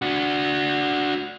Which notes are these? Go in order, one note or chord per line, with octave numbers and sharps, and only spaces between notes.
D4 F#4